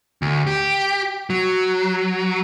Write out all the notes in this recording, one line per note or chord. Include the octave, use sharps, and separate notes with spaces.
D2
G4
F#3